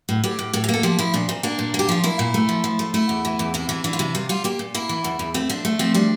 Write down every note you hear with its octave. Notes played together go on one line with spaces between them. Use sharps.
A2
A2 G4
A2
A2 A4
G4
A#3 A4
F3 G4
F3 E4
A#2 D4
A#2 C4
A#3 D4
A#2
A#3
G4
F3 F4
A#3 E4
A#2
A3
F3
F3
A3
A3 E4
E2
E3
E2
C3 E4
E3 E4
E3 D4
F4
C3 E4
G3 F4
G3 F4
A#3 G4
A#2
A#3 E4
E3
E2
E2
A3 C4
F3 D4
A3
F3 C4
G3 D4